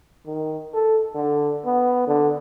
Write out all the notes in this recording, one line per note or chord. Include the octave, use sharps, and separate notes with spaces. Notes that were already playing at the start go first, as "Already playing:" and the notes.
D#3
A4
D3
B3
D3